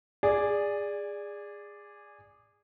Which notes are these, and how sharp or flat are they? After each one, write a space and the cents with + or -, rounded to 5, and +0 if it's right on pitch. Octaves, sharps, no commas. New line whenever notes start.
G#4 -20 D5 +0 G#5 +0